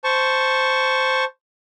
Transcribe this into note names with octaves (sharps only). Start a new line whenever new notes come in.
C5 A5 C#6